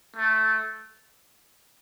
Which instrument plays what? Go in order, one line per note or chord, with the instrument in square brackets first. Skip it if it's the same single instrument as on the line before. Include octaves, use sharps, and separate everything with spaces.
[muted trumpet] A3